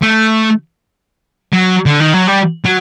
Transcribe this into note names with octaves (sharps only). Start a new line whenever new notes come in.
A3
F#3
D3
D#3
F#3
G3
F#3